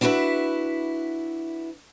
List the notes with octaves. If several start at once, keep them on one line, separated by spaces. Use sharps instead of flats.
D4 E4 F#4 G#4 B4 E5